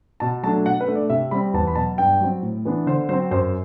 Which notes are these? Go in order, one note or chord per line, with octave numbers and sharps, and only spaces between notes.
B2 A5
F#3 A3 D4 A5
B2 F#5
B4
A3 D4
D5
C3 E5
G3 C4 B5
E2 A5
B5
B2 F#3 A5
G2 G5
F#3 C4
A2
E3 B3 D4
D3 C5
F#3 C4 C5
F#2 C5